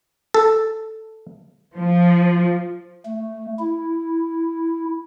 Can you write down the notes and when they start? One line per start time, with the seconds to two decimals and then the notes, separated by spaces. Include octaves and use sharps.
0.34 A4
1.78 F3
3.05 A3
3.59 E4